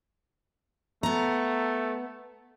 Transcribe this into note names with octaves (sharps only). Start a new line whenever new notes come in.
A3 B3 A#5